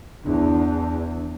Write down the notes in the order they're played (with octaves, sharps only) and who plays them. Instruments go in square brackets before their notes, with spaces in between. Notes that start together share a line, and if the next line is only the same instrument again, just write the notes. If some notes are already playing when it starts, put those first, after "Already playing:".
[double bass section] E2 [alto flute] D4